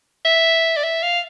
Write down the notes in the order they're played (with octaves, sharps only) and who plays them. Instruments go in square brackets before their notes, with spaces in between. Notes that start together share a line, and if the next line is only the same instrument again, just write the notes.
[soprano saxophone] E5
D5
E5
F5